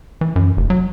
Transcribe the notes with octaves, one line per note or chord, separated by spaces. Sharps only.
E3
F#2
F1
F#3